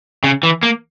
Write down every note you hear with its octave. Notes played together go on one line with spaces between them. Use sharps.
C#3
E3
A#3